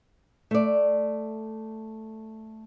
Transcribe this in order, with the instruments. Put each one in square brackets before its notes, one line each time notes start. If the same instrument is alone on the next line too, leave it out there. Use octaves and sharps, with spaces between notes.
[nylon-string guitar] A3 D5